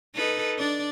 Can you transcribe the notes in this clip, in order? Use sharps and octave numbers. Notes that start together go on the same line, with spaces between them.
D#4 A4 B4
D4 D5